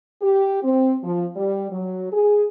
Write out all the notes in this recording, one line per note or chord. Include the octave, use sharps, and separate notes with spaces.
G4
C4
F3
G3
F#3
G#4